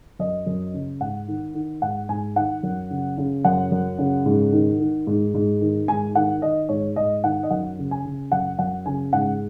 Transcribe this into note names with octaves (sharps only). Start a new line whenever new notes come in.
F#2 D#5
F#2
C#3
G#2 F#5
D#3
D#3
G#2 F#5
G#2 G#5
D#3 F#5
F#2
C#3
C#3
F#2 F#5
F#2
C#3
G#2
D#3
D#3
G#2
G#2
D#3
G#2 G#5
D#3 F#5
D#3 D#5
G#2 C#5
G#2 D#5
D#3 F#5
D#5
F#2 F#5
C#3
G#5
C#3
F#2 F#5
F#2 F#5
C#3 G#5
G#2 F#5